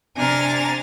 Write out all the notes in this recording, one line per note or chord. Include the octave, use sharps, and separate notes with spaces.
C3 D4 G#5 A#5 F6 A6